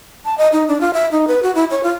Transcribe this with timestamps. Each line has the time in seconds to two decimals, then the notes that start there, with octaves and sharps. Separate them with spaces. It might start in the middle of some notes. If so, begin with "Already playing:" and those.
0.25 A5
0.38 D#5
0.53 D#4
0.68 D4
0.81 F4
0.94 E5
1.12 D#4
1.28 B4
1.43 F#4
1.55 E4
1.70 C#5
1.83 F4